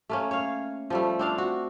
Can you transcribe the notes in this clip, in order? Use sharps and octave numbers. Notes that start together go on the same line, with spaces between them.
A3 A#3 C#4
C#5 F5
F3 G3 A3
C4 D4 F5
F#4